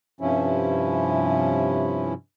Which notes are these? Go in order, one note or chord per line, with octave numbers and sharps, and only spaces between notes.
G2 C3 F3 C#4 E4